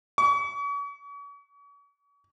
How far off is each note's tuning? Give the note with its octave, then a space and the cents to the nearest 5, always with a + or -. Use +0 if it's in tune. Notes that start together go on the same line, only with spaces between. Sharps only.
C#6 +40